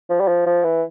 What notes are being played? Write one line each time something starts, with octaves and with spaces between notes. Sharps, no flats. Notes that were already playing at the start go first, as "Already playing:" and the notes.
F3
G3
F3
F3
E3